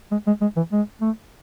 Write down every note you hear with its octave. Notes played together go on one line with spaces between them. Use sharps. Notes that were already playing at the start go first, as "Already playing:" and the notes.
G#3
G#3
G#3
E3
G#3
A3